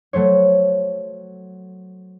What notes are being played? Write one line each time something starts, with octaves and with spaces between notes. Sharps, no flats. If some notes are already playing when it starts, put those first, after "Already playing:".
F#3 A3 C5 C#5